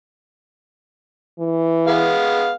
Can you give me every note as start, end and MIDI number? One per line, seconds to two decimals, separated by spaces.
1.39 2.13 52
1.87 2.51 56
1.87 2.51 59
1.87 2.51 77